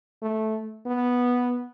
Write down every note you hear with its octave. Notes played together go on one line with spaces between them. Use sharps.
A3
B3